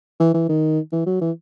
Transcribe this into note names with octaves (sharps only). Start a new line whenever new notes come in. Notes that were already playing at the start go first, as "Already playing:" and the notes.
E3
E3
D#3
E3
F#3
E3